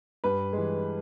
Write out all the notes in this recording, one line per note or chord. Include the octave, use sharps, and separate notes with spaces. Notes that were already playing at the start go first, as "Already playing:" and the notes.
G2 B4
E3 G#3